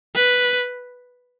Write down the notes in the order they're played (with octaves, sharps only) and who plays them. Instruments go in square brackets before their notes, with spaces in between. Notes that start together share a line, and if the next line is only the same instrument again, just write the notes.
[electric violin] B4